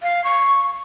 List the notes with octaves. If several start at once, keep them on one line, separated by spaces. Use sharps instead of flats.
F5
C#6